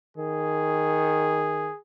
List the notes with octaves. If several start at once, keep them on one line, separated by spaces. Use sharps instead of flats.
D#3 G#4